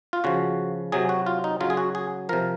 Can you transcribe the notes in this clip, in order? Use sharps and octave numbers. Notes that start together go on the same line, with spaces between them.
F4
C#3 F3 F#4
C3 F#3 G#4
F#4
F4
D#4
C#3 F#3 F4
G#4
F#4
G#4
C3 F3 A#4